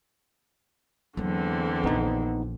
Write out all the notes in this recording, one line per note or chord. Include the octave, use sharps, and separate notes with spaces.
E2 D3 F#3 A#3 C4
A#1 B3 C#4 D#4